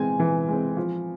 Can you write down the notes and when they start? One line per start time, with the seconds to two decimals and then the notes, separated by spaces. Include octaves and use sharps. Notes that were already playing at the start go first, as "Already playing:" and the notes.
Already playing: E3 G#3 C4 G#5
0.20 E3
0.48 G#3 C4
0.77 F3